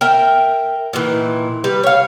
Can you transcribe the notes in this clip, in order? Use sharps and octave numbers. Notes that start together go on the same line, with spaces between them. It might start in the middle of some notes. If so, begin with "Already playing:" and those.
A#4 E5 G5
A#2 D#3 E3
G3 B4
C#5 F5